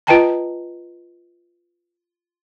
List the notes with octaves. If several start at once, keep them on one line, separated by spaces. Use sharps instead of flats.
F4 B4 D#5 G5 A5 A#5